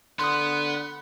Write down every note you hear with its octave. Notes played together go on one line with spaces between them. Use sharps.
D3 B3 C6 D#6 F#6